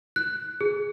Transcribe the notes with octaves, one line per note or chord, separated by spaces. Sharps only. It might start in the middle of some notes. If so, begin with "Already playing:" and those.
F#6
G#4